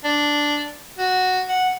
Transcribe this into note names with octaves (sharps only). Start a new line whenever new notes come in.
D4
F#4
F#5